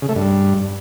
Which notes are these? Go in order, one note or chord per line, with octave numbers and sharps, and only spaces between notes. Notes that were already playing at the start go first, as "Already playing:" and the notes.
C#3
A3
G2